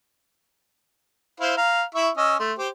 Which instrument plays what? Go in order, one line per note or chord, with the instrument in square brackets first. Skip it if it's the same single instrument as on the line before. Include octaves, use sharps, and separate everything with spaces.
[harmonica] E4 C5 F5
F5 A#5
E4 E5 C#6
C#4 D#5 E6
A3 C6
G4 C5